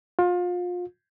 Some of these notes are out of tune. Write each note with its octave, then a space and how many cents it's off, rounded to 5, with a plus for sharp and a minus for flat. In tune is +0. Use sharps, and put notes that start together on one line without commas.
F4 +30